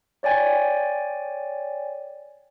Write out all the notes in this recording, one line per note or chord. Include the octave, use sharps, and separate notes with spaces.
C#5 D5 G5 G#5